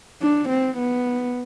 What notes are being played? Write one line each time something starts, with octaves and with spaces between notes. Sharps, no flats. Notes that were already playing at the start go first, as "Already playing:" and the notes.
D4
C4
B3